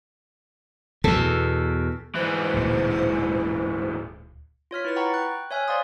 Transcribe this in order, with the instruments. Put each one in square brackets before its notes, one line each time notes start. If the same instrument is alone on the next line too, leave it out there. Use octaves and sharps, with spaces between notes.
[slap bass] E2 B2 [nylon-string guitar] A4
[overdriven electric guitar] G#2 E3 [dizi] C5
[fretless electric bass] D1 A#2
[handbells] F4 C#5 F6 B6
E4 B4 A6
F#5 G5 A#5 B5 C#6
G5 F#6
C#5 E5 G#5 F6 F#6
C5 D5 F5 C6 D#6